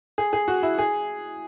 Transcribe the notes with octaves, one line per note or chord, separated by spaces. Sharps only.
G#4
G#4
F#4
E4
G#4